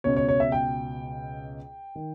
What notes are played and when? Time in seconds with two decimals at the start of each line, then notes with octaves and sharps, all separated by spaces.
0.04 C#2 B2 C#5
0.16 C#5
0.28 C#5
0.40 E5
0.52 G5
1.96 D#3